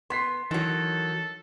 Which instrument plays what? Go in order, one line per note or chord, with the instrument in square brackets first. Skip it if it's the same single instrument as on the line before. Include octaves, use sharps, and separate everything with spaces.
[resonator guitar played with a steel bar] B3 [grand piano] C6 B6 C7
[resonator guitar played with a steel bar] D#3 F#3 [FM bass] E3 [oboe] A4